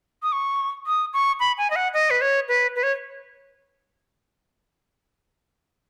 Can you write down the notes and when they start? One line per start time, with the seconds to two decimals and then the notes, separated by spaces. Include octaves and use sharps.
0.23 D#6
0.32 C#6
0.87 D#6
1.13 C#6
1.40 B5
1.58 G#5
1.71 D#5
1.76 F#5
1.94 D#5
2.10 B4
2.21 C#5
2.48 B4
2.76 B4
2.83 C#5